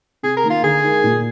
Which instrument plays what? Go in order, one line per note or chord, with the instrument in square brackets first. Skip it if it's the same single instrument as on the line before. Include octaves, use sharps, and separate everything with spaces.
[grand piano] C3 [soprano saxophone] G#4
[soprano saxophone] A#4
[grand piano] D#3 A#3 D#4
[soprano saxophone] F4
[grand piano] D3 [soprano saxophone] G#4
[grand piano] G#3 D#4 A#4
A#2